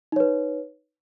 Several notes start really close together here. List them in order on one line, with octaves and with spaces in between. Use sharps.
D#4 C#5 B4